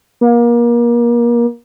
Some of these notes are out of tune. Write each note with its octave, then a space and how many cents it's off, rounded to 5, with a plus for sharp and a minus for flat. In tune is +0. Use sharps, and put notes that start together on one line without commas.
A#3 +30